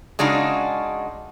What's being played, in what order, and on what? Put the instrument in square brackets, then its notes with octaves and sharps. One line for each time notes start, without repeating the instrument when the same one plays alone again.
[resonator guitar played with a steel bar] C#3 G#3 D4 D#4 F#4